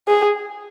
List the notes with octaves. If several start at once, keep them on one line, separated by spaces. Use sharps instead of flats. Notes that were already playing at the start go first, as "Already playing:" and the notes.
G#4